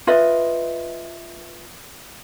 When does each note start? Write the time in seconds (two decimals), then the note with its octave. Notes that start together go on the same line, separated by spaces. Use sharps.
0.07 F4 B4 D#5 E5